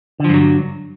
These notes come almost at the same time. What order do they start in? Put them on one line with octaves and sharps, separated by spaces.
D3 F3 G2 F#3